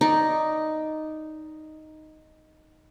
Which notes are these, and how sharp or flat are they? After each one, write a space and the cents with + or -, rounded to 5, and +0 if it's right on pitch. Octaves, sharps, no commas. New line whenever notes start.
D#4 +0 D5 +0